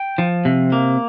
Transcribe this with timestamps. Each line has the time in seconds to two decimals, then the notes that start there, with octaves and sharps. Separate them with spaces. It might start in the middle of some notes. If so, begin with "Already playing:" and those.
Already playing: G5
0.18 F3
0.45 C3
0.72 A#3